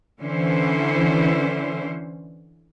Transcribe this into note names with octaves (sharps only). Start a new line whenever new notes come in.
D3 E3 C#4 E4 C5